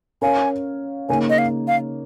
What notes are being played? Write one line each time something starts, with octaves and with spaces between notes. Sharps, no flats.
C#4 A#4 C#5 F5 G#5
C#3 A#3 D#4 C#5 G#5
D#5
F5
F5